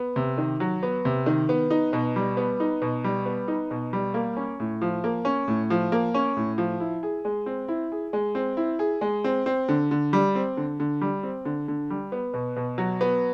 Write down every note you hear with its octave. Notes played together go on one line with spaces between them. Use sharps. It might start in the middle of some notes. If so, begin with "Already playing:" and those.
Already playing: B3
C3
D#3
F#3
B3
C3
D#3
B3
D#4
B2
G3
B3
D#4
B2
G3
B3
D#4
B2
G3
A#3
C#4
A2
F3
A#3
C#4
A2
F3
A#3
C#4
A2
F3
E4
G#4
G#3
C4
E4
G#4
G#3
C4
E4
G#4
G#3
C4
C4
D3
D3
G3
C4
D3
D3
G3
C4
D3
D3
G3
B3
B2
B2
F#3
B3